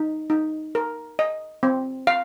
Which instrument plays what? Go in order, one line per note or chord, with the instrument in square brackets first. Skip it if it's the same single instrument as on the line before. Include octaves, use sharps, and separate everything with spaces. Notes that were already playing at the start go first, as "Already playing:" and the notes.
Already playing: [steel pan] D#4
D#4
A#4
D#5
C4
F5